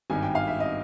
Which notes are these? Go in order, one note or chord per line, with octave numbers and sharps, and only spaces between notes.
G#1 G2 D#3 G#5
G5
F5
E5
D#5